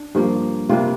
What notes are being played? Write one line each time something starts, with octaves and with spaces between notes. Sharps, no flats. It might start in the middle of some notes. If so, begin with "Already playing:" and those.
Already playing: D4
G2 F3 A#3
C3 G3 A#3 D4 F4